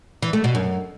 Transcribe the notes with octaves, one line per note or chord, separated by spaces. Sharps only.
E3
A3
B2
F#2